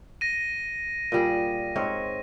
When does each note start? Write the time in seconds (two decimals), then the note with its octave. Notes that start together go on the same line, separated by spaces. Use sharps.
0.21 A#6 D#7
1.12 A#2 G3 G#4
1.76 G#2 C4 C#5